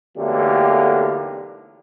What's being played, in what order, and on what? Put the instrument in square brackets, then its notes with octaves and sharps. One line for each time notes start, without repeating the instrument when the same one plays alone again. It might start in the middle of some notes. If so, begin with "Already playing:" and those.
[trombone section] B1 E2 D3 A3 A#3 G4